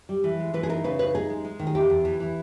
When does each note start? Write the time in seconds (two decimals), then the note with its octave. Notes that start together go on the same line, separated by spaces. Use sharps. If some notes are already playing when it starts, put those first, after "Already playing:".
0.09 G3
0.24 E3
0.40 G#3
0.54 E3 B4
0.63 G#4
0.69 D#4 A#4
0.84 C#3 B4
0.99 D#4 B4
1.15 D#4 G#4
1.30 G#3
1.44 G#3
1.59 D#3
1.67 G#4
1.75 E2 G4
1.90 E2
2.05 E3
2.20 E3